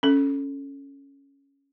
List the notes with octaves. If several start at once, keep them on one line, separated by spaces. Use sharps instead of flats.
C#4 A4